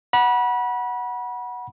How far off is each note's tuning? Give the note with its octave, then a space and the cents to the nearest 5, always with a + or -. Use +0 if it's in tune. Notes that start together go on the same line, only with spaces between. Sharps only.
F#5 +0 B5 -30